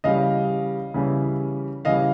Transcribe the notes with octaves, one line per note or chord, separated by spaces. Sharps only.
C#3 E3 G3 D#5 F5
C#3 E3 G3
C#3 E3 G3 D#5 F5